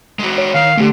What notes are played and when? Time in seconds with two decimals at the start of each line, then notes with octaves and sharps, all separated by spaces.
0.19 G#3 F#4
0.38 C#5
0.54 D#3 F5
0.77 E2 D3 A3 G4